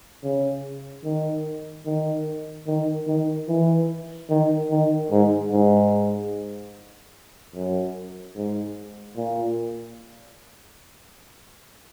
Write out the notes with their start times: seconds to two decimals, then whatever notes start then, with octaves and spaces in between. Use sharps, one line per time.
0.23 C#3
1.04 D#3
1.86 D#3
2.67 D#3
3.07 D#3
3.48 E3
4.30 D#3
4.70 D#3
5.10 G#2
5.51 G#2
7.55 F#2
8.36 G#2
9.17 A#2